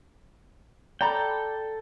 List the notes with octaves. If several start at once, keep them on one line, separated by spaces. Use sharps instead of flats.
A4 D5 G5 A#5 B5